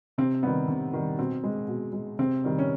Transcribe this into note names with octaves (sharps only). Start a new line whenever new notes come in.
C3 C4
D#3 G3 B3
C3
D#3 G3
B2 C4
G#3
B2
G#3
C3 C4
D#3 G3
C#4